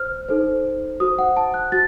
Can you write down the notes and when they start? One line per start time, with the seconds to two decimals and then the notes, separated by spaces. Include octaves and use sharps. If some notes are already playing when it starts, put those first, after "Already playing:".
Already playing: C5 F6
0.29 D#4 A4 C5
1.00 F#4 C5 D#6
1.18 F#5
1.37 A5
1.54 F#6
1.72 F#4 A6